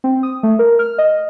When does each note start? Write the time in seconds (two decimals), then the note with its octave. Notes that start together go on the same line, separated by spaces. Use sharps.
0.04 C4
0.23 D#6
0.43 A3
0.59 A#4
0.79 F6
0.98 D#5